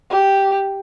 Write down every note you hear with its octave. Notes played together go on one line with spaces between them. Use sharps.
G4